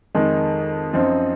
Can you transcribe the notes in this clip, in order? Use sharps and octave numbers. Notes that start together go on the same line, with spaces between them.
F2 D#3 G#3 D#4
F#2 F3 C4 D#4